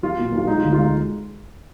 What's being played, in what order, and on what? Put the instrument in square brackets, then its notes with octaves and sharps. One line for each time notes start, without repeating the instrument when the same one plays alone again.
[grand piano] F#3 F4
A#2
B1
F4
G#3 D#4
D2 F4
F4
G#3 D#4